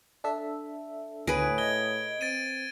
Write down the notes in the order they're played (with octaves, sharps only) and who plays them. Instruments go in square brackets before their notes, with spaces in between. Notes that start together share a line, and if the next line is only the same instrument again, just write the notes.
[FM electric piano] D4 A4 E5
[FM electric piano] D2 [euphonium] A2 [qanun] G#4 B4 [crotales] D7
[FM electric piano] D#5 [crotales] G#6 G7
[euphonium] C4 [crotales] A6 D7 D#7